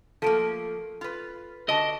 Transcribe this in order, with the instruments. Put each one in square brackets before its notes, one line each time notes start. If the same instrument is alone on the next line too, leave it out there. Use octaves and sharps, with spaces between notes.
[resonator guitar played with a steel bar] F3 A3 A#3 [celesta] A4 D7
[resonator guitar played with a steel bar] F4 B4
[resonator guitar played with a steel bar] D3 F#4 A5 [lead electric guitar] D#5 [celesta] D7